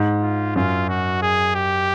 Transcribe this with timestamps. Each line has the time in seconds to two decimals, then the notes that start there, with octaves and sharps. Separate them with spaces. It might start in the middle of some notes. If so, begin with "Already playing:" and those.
Already playing: G#2
0.22 F4
0.56 F#2 F4
0.89 F#4
1.22 G#4
1.55 G4